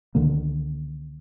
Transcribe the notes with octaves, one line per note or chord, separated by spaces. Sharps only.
C#2 D3 D#3 A#3